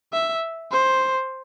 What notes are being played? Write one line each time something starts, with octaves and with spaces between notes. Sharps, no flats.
E5
C5